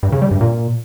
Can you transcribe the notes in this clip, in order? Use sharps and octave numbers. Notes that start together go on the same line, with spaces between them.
G2
C#3
G3
G2
A#2